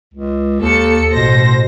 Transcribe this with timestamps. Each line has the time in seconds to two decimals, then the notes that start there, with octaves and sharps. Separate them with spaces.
0.14 C#2
0.60 D#2 A4 C#7
1.13 A1 B2 C5 A#6